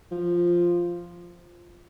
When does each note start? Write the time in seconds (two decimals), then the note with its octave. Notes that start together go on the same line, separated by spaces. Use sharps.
0.11 F3